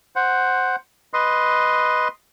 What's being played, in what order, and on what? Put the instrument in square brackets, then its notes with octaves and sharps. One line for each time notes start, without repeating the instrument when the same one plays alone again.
[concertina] C5 F#5
B4 D#5 C6